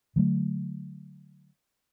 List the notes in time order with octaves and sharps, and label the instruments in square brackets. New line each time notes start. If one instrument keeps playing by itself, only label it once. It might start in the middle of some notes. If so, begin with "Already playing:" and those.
[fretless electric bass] D3 F#3 A3